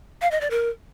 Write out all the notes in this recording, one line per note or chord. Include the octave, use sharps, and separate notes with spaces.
F5
D#5
D5
A#4